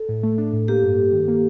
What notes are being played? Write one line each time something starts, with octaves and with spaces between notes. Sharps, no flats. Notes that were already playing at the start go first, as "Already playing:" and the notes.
Already playing: A4
A2
A3
D4
A2
A#3 G4
G2
G2
D#3
A#3